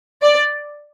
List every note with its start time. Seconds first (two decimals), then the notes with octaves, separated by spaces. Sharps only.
0.22 D5